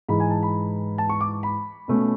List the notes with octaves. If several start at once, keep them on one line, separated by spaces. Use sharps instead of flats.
G#2 E3 G#3 B5
G#5
A5
B5
A5
C#6
D6
B5
B2 A3 C#4